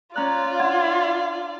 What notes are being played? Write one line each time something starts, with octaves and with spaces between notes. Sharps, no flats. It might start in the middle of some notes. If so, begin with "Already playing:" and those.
C#4 F4 D5 A#5 F#6
D4 F#5 C6 G#6